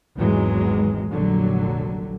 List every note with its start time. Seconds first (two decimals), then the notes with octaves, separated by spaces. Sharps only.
0.16 G#1 E2 E3 F#3 G#3
1.10 F1 A#1 D3 F#3 G3